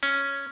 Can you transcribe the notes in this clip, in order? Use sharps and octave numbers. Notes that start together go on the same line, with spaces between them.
C#4